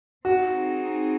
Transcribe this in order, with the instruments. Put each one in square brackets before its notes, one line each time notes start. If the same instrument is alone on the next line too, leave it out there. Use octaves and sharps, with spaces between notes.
[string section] C4 D#4 G#4 [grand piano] F#4